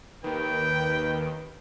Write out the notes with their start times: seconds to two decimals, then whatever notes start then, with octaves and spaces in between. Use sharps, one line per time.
0.24 D#2 D#3 B4 G5